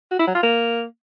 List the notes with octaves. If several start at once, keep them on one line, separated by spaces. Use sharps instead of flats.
F#4
E4
F#3
F4
A#3